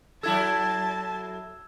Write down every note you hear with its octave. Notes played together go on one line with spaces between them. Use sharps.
F#3 E4 A4 A5 E6 G#6 E7